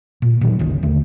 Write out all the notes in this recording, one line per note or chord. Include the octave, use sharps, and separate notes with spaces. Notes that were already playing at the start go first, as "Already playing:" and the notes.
A#2
A#2 D#3 F#3
G1 C#2 D#3
D#2 D3 A3